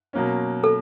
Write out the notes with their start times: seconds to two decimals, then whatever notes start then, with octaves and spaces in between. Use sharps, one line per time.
0.13 B2 F#3 A#3 C#4
0.64 A4